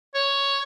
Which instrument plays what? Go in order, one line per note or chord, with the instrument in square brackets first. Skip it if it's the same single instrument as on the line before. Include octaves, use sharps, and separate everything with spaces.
[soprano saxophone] C#5